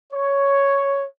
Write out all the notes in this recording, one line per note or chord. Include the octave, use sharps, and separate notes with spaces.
C#5